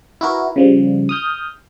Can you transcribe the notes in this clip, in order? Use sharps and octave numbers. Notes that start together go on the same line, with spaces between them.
E4 F#4 A#4 B4
C#3 F3 G3
D#6 F6 G6